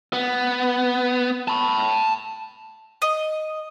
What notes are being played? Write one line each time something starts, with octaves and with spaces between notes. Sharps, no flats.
B3
A5 B5
D#5